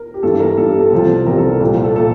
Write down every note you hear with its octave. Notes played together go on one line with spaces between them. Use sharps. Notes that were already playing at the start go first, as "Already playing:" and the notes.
Already playing: A#4
G4
G2 E3 A4
A#4
G2 E3 A4
G4
A4
C2 C3 F3
C2 C3 F3 A#4
A4
A#4
C2 A#2 F3
A4
A#2 F3 A4